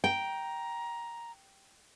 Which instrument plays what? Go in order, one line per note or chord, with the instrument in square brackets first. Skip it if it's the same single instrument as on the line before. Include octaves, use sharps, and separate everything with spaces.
[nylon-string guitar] G5 [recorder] A#5